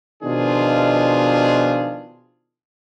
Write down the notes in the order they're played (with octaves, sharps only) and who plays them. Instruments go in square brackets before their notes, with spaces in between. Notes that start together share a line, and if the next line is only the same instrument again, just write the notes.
[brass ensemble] B2 D#3 F3 D4 F4 G#4